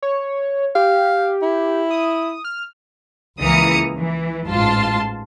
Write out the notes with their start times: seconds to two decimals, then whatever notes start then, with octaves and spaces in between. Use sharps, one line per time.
0.02 C#5
0.75 G4 F5
1.42 E4
1.91 D#6
2.45 F6
3.40 C#2 E3 A#3 A#5 D#6 C#7
3.97 E3
4.48 A1 G#2 F4 A5 C6